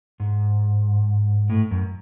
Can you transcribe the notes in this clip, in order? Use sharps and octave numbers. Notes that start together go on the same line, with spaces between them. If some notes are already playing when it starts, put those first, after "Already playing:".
G#2
A2
F#2